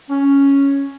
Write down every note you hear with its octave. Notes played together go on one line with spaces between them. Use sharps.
C#4